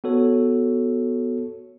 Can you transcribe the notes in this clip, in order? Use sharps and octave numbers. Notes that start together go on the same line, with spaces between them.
B3 F#4 A4 C#5